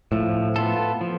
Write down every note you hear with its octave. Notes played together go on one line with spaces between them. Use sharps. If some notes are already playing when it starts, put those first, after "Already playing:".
A2 F3
B3 F4 A4
F3